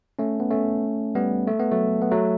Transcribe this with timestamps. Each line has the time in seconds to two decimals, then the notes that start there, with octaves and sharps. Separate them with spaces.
0.19 A3 C#4
0.40 B3
0.51 A3 C#4
1.15 G3 B3
1.47 A3
1.59 B3
1.71 F#3 A3
2.02 B3
2.12 F#3 A3